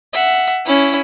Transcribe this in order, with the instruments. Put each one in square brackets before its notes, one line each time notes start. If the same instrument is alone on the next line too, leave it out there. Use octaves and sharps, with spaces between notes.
[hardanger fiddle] E5 F#5
C#4 E4